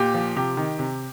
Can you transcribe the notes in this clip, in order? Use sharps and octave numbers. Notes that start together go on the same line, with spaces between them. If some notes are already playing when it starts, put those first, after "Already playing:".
Already playing: A#2 G4
F3
C3 G4
D#3
C3